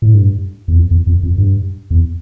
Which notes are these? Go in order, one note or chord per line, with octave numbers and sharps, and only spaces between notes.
A2
G2
E2
F2
E2
F2
F2
G2
E2